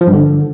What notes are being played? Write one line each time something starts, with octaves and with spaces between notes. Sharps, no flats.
F3
G2
D3